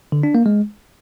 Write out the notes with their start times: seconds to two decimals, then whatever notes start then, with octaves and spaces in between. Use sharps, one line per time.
0.12 D3
0.23 D4
0.35 A#3
0.46 G#3